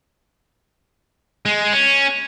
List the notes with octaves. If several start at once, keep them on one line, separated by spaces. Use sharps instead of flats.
G#3
C#4